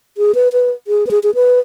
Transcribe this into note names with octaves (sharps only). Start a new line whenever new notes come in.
G#4
B4
B4
G#4
B4
G#4
G#4
B4